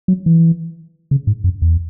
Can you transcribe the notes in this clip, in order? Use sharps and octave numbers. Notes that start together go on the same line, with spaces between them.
F#3
E3
C#3
G#2
F#2
E2